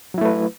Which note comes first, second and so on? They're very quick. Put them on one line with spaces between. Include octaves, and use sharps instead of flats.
F#3 E4 A3 B4